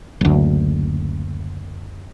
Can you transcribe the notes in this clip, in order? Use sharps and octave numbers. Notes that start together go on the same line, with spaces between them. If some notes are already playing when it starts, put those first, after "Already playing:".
F#1 D2